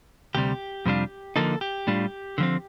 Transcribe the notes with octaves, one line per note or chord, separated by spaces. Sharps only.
D2 C3 G3 G4
F2 C3 G3 D4 F4
D3 F3 A#3 D#4 A4
G4
A2 G3 D4 F4
D3 F3 C4